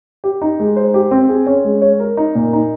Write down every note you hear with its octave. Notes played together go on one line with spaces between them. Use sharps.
G4
D#4
G#3
C5
G4
C4
G#4
C#4
G#3
C#5
A#4
D#4
A#2
D#4